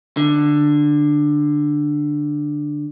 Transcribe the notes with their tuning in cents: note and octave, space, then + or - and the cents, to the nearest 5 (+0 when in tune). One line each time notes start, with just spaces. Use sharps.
D3 +10